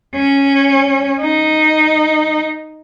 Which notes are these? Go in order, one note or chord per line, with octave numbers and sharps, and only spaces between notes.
C#4
D#4